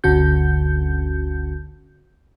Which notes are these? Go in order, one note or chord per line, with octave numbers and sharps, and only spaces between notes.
G1 D2 D3 C#4 F#4 G6